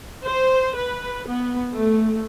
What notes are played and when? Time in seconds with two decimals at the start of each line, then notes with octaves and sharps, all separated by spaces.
0.24 C5
0.76 B4
1.28 B3
1.72 A3